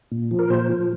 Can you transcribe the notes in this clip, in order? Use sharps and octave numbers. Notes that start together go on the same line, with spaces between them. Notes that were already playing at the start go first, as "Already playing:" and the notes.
A#2
F3
A#4
A#2 C5
F3